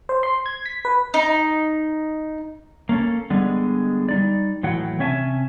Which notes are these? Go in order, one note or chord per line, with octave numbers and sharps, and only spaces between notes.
C5
C6
G#6
B6
B4
D#4
A#3 C#4 A4
D3 G3 G#3 B3
G3 D#4 D5
A2 E3 F#3 F#5 G5
C3 C#4 C#5 E5 G#5 A5